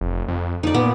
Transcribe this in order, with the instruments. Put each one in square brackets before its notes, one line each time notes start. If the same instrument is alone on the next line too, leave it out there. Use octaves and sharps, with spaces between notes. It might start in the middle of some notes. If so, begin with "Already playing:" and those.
[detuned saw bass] F1
F2
[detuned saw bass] F2 [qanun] D#4 D5
[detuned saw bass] A#2 [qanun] B3